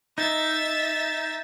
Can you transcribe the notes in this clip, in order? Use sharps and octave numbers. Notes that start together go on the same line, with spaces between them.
D#4 E5 A6